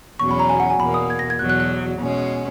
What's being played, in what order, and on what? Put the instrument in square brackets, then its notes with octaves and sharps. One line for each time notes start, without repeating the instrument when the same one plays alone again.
[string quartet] E2 B2 F#3 C#4 [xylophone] C#6
[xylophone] B5
A#5
G#5
F#5
G#5
[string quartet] E2 B2 A#3 [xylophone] B5
[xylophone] D#6
G#6
A#6
G#6
[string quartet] E2 B2 F#3 [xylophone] F#6
[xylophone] F#6
F#6
[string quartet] B2 G#3 C#4